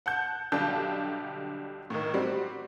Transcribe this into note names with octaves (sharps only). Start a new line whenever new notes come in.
F#5 A5 G6
B1 D3 G3 G4 A5 G6
A2 D#3
G3 C4 F#4